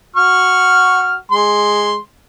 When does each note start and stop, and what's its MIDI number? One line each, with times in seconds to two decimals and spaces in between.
0.16 1.15 66
0.16 1.15 85
0.16 1.15 89
1.31 1.97 56
1.31 1.97 84